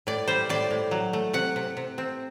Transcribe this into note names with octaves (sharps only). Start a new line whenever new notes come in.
A2 D5
G3 C5
A2 D5
A2
F#3
A3
C3 F#5
C3
C3
C4